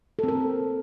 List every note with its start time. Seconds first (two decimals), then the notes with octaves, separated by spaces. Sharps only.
0.19 A4
0.24 C4
0.28 A#4